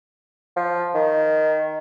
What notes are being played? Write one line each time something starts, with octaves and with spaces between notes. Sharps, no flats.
F3
D#3